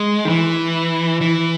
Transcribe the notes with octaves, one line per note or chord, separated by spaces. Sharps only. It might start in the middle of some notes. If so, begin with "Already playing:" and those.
Already playing: G#3
D#3
E3
E3